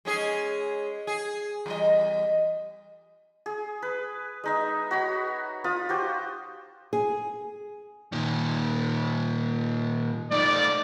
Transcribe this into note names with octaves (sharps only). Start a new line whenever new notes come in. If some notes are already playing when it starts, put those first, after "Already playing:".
G#3 C#4 G#4
G#4
E2 G3 D#5
G#4
B4
G#3 D#4 E5
F#4 C#5 B5
F4 B5 D#6
F#4 G4 C5
G#4
A#2 D#3
A3 D#4 D5